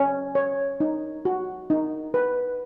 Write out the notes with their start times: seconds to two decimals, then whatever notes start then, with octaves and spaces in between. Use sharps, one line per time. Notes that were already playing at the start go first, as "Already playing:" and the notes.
Already playing: C#4
0.35 C#5
0.80 D#4
1.25 F#4
1.70 D#4
2.14 B4